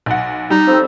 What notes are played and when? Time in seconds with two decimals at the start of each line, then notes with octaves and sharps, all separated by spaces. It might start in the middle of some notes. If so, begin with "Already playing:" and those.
0.06 B1 F#5
0.50 G3 D#4
0.67 F2 F3 C4